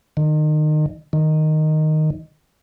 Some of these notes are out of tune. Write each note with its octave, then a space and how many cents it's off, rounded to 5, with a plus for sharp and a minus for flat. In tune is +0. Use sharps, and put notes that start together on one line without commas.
D#3 -30
D#3 -5